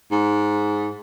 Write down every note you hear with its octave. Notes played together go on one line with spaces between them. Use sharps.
G#2